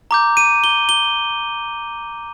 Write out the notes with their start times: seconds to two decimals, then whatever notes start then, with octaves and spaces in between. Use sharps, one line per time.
0.11 A#5 D6 G6
0.37 D#7
0.64 G7
0.89 G7